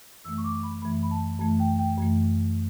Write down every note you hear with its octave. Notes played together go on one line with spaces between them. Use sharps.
F#2 E3 A3 E6
C#6
D6
B5
F#2 E3 A3 B5
B5
A5
F#2 E3 A3 A5
G5
G5
F#2 E3 A3